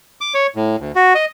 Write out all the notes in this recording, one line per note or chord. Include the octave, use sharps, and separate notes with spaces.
D6
C#5
A2
D2
F#4
D#5